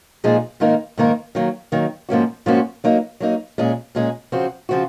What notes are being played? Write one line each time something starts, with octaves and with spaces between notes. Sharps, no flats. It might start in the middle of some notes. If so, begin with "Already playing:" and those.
A#2 F3 G#3 D#4 G#4
G#2 D#3 A#3 D#4 A#4
G#2 D#3 A#3 D#4 A#4
D#3 F#3 A#3
D#3 F#3 A#3
G#2 F3 A#3 C#4 F#4
G#2 F3 A#3 C#4 F#4
F#3 A#3 D#4
F#3 A#3 D#4
A#2 G#3 C#4 G#4
A#2 G#3 C#4 G#4
C#3 F3 C4 F#4
C#3 F3 C4 F#4